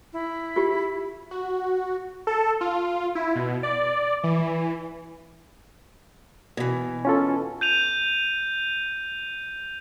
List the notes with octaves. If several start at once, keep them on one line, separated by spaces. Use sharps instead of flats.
E4
F4 G4
F#4
A4
F4
E4
B2
D5
E3
B2 E3
C#4 F4 A4
G6 D#7 F7